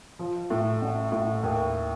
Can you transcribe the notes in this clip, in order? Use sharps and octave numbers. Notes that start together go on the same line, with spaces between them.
F3
A2
A1
A2
D#2